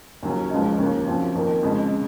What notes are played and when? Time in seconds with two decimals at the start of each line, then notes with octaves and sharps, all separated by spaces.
0.23 D#2 C#3 F#3 C#4
0.50 C#2 C#3 F3 G#3 D#4
0.78 D#2 C#3 F3 A#3
1.06 F#2 F3 C4
1.35 F2 D#3 A#3
1.63 F2 C#3 G#3
1.92 C#3